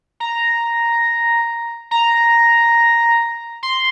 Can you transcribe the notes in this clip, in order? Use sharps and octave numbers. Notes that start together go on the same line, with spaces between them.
A#5
A#5
C6